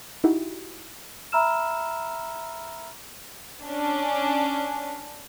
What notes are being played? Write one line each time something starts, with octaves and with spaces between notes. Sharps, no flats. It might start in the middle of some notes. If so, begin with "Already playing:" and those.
D#4 E4 F#4 G4
E5 A#5 B5 E6 F6 E7
C#4 D4